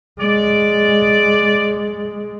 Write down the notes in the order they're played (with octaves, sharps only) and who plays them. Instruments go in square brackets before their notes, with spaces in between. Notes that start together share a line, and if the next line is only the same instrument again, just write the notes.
[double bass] G#3 [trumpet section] D5